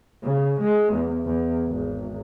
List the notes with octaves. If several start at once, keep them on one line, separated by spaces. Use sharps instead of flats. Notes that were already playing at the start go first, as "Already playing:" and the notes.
C#3
G#3
E2
E2
G#1